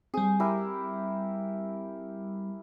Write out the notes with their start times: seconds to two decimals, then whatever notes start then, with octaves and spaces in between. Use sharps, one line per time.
0.14 G3 C4 G#4
0.40 E4 G4 A#4